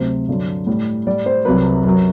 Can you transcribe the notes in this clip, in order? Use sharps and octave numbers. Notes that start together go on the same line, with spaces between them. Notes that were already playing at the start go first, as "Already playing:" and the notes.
Already playing: D2 C3 F#3 C5
G2 D3 F#3
A2 G3
A2 G3 D5
C5
C2 C3 F#3 B4
F#2 F#3